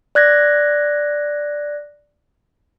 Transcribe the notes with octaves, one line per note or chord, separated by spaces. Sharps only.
D5 F#6 G#6 A#6